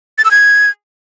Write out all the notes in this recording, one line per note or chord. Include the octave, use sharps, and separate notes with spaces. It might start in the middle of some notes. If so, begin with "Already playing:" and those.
A6
E6
G#6